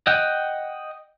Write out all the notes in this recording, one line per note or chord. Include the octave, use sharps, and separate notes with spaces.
D#5 F#5 G5